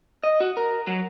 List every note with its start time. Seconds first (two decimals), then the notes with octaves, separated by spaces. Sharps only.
0.24 D#5
0.40 F#4
0.57 A#4
0.87 F#3